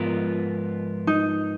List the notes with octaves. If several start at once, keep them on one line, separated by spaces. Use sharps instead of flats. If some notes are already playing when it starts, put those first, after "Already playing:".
Already playing: G#2 F3 B3 F4 A#4
D#4